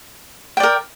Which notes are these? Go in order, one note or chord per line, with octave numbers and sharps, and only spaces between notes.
A#4 D5 G5